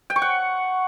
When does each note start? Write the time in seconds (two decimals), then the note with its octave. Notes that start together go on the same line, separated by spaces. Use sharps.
0.10 G5
0.16 C#6
0.22 F#5